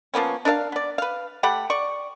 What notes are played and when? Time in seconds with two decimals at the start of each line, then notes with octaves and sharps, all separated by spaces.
0.14 F3 A#3 B3 C#4
0.45 D4 A#4 D#5 F5
0.72 B3 D5
0.98 B4 F5
1.43 A3 G4 F#5 B5
1.70 D5 C#6